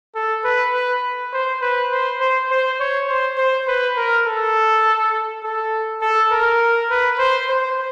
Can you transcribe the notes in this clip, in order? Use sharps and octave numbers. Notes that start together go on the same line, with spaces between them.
A4
B4
B4
C5
B4
C5
C5
C5
C#5
C5
C5
B4
A#4
A4
A4
A4
A#4
B4
C5
C5